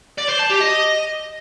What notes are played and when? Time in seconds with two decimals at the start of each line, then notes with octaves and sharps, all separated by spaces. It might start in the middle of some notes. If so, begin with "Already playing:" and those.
0.18 D5
0.29 C5
0.39 A5
0.50 G4
0.60 D#5